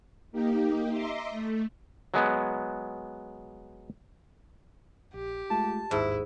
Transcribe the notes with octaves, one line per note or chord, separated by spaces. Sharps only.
A#3 D#4 G4
D#5 E5 A#5 C6 D6
A3
F#3 G#3 B3
A#1 G4
G#3 A3 F4 A5
A1 D#2 G#2 E4 D#6